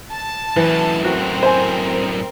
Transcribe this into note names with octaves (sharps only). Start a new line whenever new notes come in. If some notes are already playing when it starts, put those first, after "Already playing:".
A5
F#2 A2 E3
C4 F#4 A#4
C5 G#5